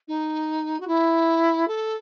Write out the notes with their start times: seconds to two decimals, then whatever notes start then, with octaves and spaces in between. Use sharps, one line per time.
0.08 D#4
0.80 F#4
0.88 E4
1.68 A4